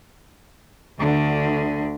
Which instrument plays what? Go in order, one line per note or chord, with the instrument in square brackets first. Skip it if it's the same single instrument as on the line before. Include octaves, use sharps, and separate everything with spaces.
[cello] D2 D3